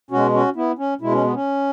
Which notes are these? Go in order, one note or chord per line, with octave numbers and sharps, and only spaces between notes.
B2 G#3 C#4 F#4
C#4 F#4
B3 E4
C#4
B2 G#3 E4
C#4
B3
C#4